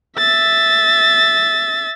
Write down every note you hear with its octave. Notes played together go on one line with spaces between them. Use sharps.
E5 A6